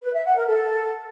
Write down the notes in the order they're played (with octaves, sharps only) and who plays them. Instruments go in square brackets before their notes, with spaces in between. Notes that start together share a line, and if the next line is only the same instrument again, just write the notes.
[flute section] B4
E5
F#5
A#4
A4